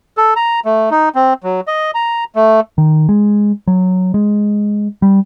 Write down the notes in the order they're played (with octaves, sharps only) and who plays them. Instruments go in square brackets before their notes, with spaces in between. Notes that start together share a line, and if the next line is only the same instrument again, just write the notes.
[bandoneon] A4
A#5
A3
D#4
C4
F#3
D#5
A#5
A3
[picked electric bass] D#3
G#3
F#3
G#3
G3